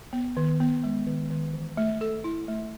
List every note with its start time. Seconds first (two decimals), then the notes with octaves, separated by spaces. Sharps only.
0.13 B3
0.37 D#3
0.60 B3
0.84 G#3
1.07 D#3
1.31 D#3
1.54 E3
1.77 A3
2.01 A4
2.24 E4
2.48 A3